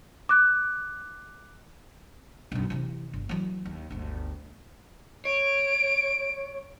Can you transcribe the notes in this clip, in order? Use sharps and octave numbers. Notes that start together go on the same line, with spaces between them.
D6 F#6
B1 F#2
C3 E3
G1
E3 F#3
D#2
G1 D2
C#5 D7